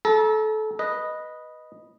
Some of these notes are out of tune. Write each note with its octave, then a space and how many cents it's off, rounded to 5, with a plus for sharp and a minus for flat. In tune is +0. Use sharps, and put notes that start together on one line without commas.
A4 -25 A#5 +30
B4 -10 D#5 +0